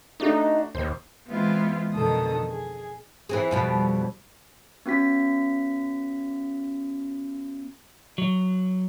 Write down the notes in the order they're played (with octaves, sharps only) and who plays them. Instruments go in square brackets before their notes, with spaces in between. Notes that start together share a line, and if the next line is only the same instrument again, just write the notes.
[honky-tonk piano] A3 D4 F#4 [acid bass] D#4
[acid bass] D#2 [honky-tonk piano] C5
[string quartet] E3 G#3 B3 C4 E4 F4
F2 B2 D3 D#3 A4 D#6
G#4
[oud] E3 C4 G#4
F2 B2 G3
[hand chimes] B3 C#4 F#4 B6
[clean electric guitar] F#3